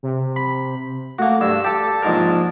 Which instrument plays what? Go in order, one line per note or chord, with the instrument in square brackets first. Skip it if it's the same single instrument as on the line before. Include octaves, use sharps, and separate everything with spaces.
[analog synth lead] C3
[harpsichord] B5
[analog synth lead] A3 [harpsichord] A#3 F#4
[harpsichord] G2 [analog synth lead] E6
[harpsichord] G4 A4 [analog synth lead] A5
[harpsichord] A#1 G#2 A#4